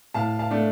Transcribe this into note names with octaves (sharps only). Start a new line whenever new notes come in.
A2 F5 A5
F5 A5
A3 D4